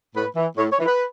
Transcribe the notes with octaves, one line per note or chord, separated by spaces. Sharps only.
A2 B4
E3
A2 C#5
C#5
E3
B4